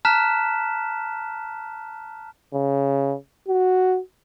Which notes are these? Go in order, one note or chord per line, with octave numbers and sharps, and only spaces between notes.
A5 A#5 F6 F#6 B6 E7
C#3
F#4